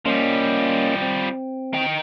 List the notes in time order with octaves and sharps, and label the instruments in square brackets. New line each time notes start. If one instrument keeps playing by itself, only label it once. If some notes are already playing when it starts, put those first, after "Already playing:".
[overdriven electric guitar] F3 G3 [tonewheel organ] A#3 C#4 D#5
[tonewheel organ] C4
[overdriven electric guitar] D#4 G5